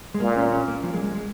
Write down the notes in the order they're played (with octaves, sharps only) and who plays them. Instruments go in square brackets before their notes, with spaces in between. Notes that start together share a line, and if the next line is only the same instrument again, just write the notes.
[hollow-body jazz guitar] G#3
[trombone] A#2 [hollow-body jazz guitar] A#3
[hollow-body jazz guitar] C#4
C#4
A#3
F3
G#3
G#3
G#3